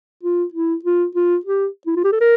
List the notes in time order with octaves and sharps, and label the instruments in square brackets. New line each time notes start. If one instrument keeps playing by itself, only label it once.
[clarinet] F4
E4
F4
F4
G4
E4
F4
G4
A4
A#4